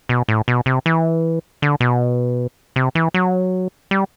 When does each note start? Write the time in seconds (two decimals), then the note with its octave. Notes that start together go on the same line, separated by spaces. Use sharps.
0.09 B2
0.28 A2
0.48 B2
0.66 C3
0.86 E3
1.62 D3
1.80 B2
2.76 C3
2.95 E3
3.14 F#3
3.91 G3